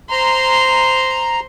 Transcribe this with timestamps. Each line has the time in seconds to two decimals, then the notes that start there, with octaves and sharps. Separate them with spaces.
0.10 C5 A#5 C6